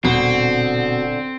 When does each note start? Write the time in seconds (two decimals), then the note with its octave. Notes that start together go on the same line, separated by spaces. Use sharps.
0.05 D#1 B2 D3 C4